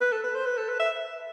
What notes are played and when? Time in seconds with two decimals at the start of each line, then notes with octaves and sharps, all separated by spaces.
0.01 B4
0.12 A4
0.24 B4
0.35 C5
0.46 B4
0.57 A4
0.69 B4
0.80 E5